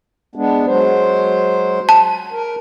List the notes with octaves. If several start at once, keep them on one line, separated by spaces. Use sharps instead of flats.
G#3 B3 D4
F#3 G#3 C5
A5
A#4